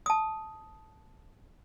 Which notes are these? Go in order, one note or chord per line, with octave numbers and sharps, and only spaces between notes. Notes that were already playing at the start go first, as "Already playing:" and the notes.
A5 D#6